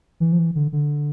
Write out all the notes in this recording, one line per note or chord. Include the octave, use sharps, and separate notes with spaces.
E3
F3
E3
D3
D3